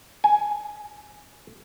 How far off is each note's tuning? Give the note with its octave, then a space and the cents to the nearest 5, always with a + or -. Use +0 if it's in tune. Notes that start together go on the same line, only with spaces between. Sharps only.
G#5 +5